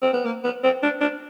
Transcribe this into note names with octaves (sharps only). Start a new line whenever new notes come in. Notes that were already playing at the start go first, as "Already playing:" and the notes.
C4
B3
A#3
B3
C4
D4
D4